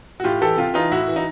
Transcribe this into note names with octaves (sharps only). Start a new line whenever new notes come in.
F#4
A2 F4 G4
E3 G4 A4
C3 F4 G4
E3 D#4 F4
A2 E4 F#4
E3
D#4